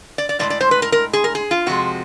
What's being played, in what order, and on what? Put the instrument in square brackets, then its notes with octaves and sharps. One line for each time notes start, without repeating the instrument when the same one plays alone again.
[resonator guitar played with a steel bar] D5
D5
A2 F3 G#3 D5
D5
C5
B4
A#4
A#4
G#4
A#4
G#4
F4
F2 C3 F3 G#3 F#4